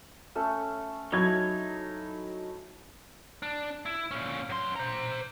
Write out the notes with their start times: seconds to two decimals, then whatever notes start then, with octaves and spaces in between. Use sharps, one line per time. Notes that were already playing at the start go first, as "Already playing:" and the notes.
0.35 A3 C#4 A4
1.12 F#3 D#4 E4 C#5 G#6
3.42 D4
3.86 E4
4.11 A#2 C#4
4.50 F#2 C6
4.76 C5 A#5